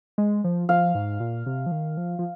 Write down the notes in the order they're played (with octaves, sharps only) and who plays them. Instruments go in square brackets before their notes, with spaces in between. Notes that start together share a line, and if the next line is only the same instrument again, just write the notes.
[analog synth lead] G#3
F3
[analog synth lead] F3 [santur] F5
[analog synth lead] G#2
A#2
C3
F3
D#3
F3
F3